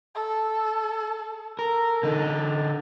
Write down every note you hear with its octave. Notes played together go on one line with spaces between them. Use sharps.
A4
A4 A#4
D3 D#4